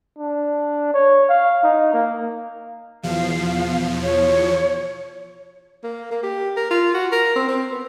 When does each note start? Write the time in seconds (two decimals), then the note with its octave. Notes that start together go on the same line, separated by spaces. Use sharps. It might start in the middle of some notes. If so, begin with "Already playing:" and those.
0.19 D4
0.94 C#5
1.29 F5
1.63 D#4
1.93 A#3
3.03 E2 B2 F3 F5
4.03 C#5
5.83 A#3
6.11 A#3
6.23 G4
6.56 A#4
6.71 F4
6.94 F#4
7.12 A#4
7.36 C4
7.48 C4
7.71 B3